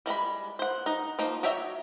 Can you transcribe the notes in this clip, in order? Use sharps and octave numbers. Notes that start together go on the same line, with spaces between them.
G3 G#3 A#5 B5
C5 F#5
D#4 D#5
F3 A#3 D#4
F#4 G4 C#5 D#5 E5